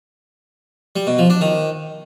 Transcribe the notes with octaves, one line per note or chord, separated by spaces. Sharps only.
G3
B2
F3
D4
D#3